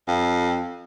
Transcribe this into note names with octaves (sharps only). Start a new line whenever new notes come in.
F2